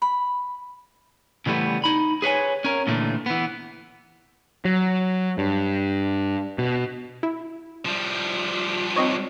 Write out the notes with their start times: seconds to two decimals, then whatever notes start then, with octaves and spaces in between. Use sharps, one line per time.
0.02 B5
1.46 C#3 E3 G3 A3 B3
1.84 D#4 B5
2.22 G#4 B4 C#5 G#5
2.64 C#4 A#4
2.87 A#2 D3 E3 A3
3.26 E3 B3
4.65 F#3
5.38 G2
6.58 B2
7.23 E4
7.86 F3 G3
8.96 C4 D#4 C#5